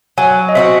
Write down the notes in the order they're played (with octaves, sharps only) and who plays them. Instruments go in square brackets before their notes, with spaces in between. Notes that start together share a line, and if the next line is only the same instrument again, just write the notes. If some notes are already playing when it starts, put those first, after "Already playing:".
[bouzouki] F#3 [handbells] G#5
[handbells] D#5
[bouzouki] C4 D#4 F#4 [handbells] E5